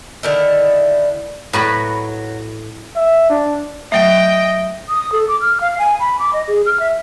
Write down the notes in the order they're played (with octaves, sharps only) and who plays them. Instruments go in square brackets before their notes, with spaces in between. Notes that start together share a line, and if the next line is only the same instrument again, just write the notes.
[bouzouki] D3 D#3 E4
[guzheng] A2 B4 B5 [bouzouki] F#3
[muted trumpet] E5
D4
[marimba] F#3 A3 [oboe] D#5 [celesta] E5 [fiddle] G5
[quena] D#6
A4
D6
F6
F5
G#5
B5
D6
D#5
G#4
F6
E5